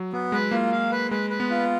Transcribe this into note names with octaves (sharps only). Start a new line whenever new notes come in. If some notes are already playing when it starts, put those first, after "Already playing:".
Already playing: F#3
F#3 B3
G#3 B4
A#3 F4
F5
B4
G#3 B4
B4
B3
F4